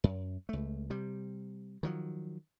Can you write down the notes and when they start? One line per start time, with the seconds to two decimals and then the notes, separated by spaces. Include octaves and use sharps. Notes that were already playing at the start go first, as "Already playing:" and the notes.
0.04 F#2
0.49 C#2 A3
0.90 C3 G3
1.83 D#3 F3 F#3